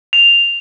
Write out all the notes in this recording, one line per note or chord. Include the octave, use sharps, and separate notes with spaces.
F7